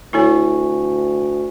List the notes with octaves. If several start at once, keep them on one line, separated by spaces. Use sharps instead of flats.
D2 E4 A4 C#5 G#5 C#6